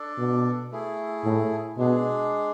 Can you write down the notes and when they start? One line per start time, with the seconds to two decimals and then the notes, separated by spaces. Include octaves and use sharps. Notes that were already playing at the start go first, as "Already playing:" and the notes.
Already playing: D4 A4 D5
0.18 B2
0.71 A3 E4 G#4
1.24 A2
1.77 B2 G#3 D4 G#4